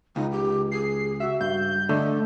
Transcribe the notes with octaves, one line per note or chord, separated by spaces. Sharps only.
C#2 D#4
G4
G#4 C7
F#4 E5
G2 G6
D3 A3 D#5